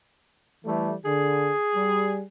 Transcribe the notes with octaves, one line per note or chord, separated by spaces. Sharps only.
E3 G3 A3
D3 G#4
G3